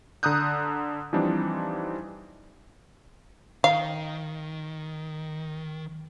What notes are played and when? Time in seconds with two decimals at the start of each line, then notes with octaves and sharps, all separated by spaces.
0.23 D3 A#5 D#6 F#6 G6
1.13 E3 F3 G3 C4 D4 D#4
3.64 D#3 F5